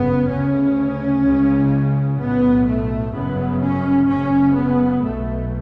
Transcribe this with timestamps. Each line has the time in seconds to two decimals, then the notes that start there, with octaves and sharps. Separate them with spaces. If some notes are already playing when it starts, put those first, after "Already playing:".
Already playing: G1 F#2 C#3 B3
0.30 D2 C#3 C#4
1.24 C#2 C#3
2.19 B1 A2 B3
2.67 A3
3.14 G1 F#2 C#3 B3
3.61 C#4
4.08 F#1 F#2 C#3 C#4
4.55 B3
5.02 B1 B2 A3